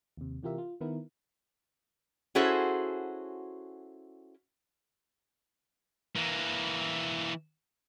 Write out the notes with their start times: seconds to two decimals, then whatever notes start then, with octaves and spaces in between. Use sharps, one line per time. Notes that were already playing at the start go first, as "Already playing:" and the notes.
0.17 D#2 C3
0.43 C3 E3 F4 G4 A#4 E5
0.58 F4
0.81 D#3 B3 E4 A#4
2.35 C#4 E4 F#4 G#4 A4 C5
6.16 E3 A#3